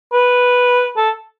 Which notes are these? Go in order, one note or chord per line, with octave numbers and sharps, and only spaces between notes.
B4
A4